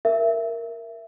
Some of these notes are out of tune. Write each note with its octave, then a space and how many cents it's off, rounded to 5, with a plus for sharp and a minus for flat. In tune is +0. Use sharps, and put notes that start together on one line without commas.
A#4 +0 E5 +15